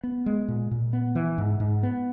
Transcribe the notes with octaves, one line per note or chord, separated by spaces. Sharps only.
B3
G#3
A#2
A#2
B3
E3
G#2
G#2
B3